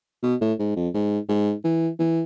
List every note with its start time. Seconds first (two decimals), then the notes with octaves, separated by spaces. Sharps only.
0.23 B2
0.41 A2
0.59 G#2
0.76 F2
0.94 G#2
1.29 G#2
1.64 E3
1.99 E3